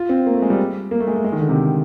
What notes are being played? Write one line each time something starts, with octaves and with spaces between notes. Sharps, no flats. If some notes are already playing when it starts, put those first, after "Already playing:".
Already playing: F4
C4
A#3
A3
G#3
G3
A#3
A3
G#3
A3
G#3
D#3
D3
C3